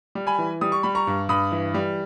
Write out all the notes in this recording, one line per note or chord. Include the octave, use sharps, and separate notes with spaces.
G3
G#5 B5
E3
G3 D#6
C#6
G3 B5
A#5 C#6
G2
G2 B5 D#6
E3
G3